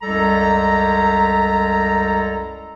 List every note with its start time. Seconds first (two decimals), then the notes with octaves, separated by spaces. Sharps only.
0.02 C2 F#2 G3 G#3 A4 A#5